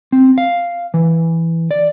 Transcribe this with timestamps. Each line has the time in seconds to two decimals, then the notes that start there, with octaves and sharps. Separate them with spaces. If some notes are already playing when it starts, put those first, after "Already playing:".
0.12 C4
0.38 F5
0.94 E3
1.71 D5